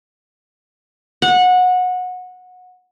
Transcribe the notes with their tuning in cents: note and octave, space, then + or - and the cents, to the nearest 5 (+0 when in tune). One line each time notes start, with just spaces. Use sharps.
F#5 -20